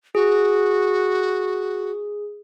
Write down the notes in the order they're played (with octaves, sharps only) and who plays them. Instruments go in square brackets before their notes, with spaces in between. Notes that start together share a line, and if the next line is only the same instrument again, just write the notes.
[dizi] F#4 [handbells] G#4